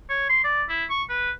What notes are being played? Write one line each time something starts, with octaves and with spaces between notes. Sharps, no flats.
C#5
C6
D5
E4
C#6
B4